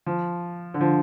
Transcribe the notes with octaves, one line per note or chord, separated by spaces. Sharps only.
F3
D3
F3